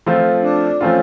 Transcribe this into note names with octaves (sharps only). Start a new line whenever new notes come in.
F3 A3 C4 F4
D4
F3 A3 C4 C#4 F4